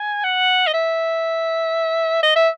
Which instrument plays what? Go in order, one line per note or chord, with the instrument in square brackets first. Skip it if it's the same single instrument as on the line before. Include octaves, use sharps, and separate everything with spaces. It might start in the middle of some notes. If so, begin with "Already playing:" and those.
Already playing: [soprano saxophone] G#5
F#5
D#5
E5
D#5
E5